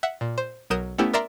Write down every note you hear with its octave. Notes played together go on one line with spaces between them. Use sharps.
E5 F#5
A#2
C5
B1 F#3 A#4 D#6 G6 E7
A3 B3 C#4 E4 G4
A#4 D5 E5 A#5 C6